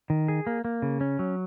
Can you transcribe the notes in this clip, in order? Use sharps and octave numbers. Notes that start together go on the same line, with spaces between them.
D#3
G#4
A#3
A#3
C#3
C#4
F#3